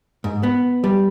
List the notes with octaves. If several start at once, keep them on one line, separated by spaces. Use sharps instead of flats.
G#2
B3
G3